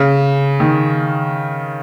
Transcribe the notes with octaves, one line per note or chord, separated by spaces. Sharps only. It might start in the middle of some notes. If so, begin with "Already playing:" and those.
Already playing: C#3
D#3